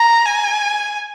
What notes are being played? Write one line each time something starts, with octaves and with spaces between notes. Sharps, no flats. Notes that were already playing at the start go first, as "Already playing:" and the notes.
Already playing: A#5
G#5